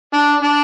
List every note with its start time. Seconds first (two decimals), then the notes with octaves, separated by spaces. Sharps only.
0.13 D4
0.43 D4